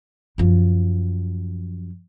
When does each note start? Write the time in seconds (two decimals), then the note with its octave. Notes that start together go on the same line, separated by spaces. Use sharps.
0.38 F#2 F3